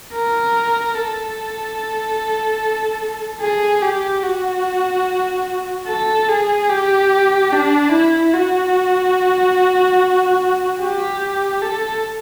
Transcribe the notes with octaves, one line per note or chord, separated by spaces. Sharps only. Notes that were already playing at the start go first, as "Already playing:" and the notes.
A#4
A4
G#4
G4
F#4
A4
G#4
G4
D4
E4
F#4
G4
A4